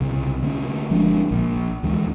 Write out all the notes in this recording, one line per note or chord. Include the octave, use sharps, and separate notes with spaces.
C2 C#3
D3 A3 C4 C#4
G1 F3 G#3 D4
A#1
D2 E3 G#3